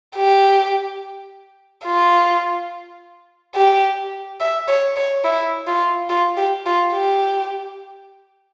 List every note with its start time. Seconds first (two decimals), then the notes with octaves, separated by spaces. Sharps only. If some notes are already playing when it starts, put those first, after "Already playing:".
0.16 G4
1.85 F4
3.55 G4
4.40 E5
4.68 C#5
4.96 C#5
5.24 E4
5.67 F4
6.10 F4
6.37 G4
6.66 F4
6.94 G4